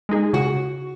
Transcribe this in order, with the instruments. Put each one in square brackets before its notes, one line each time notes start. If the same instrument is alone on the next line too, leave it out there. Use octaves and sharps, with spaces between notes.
[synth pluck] G#3 D#4 G#4
[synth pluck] C#3 [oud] F#4